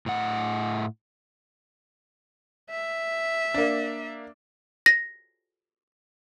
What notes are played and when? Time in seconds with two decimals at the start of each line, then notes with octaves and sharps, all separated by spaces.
0.06 A2 F#5
2.70 E5
3.54 A#3 D4
4.86 A#6